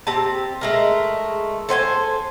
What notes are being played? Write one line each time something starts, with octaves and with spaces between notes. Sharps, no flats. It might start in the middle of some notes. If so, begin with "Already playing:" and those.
C4 G4 A5
G#3 A3 A#4
A4 C5 G5 G#5